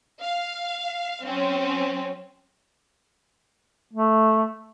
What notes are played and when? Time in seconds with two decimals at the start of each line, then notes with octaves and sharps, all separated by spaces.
0.21 F5
1.22 F#3 C4 C#4
3.94 A3